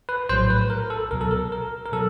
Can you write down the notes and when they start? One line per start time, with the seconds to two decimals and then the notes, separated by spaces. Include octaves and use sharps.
0.09 B4
0.29 A#1 A2 F#3 C5
0.50 B4
0.70 A#4
0.90 A4
1.11 C#2 B2 F#3 A#4
1.21 A4
1.31 A#4
1.52 A#4
1.86 A#4
1.93 B2 F#3 A4